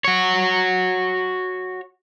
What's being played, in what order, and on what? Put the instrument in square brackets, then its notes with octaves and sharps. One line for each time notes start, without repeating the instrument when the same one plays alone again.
[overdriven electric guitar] F#4 C#5